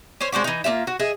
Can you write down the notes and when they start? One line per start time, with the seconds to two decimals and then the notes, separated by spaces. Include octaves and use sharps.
0.21 C#4 C5 C#5
0.32 G#3 C4 D4 F#4
0.44 E3 D#4
0.64 A#3 D#4 F4 E5
0.87 F#4
0.99 G#4 D#5 E5